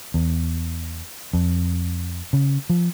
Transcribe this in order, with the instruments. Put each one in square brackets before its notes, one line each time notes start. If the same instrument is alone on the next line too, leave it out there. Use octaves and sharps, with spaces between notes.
[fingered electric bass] E2
F2
C#3
F3